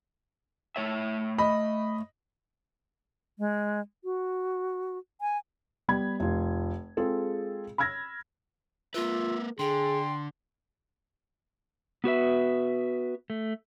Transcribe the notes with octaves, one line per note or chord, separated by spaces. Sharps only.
A3 C#5 E5
D#5 B5
G#3
F#4
G#5
G3 B3 B5 G#6
F1 F4
G#3 C4 F4 G#4 A4
B5 E6 F6 G#6 A#6
A#3 F4 A#4 B4 E5
D3 G#4 G5 C6
B3 F#4 B4 E5
A3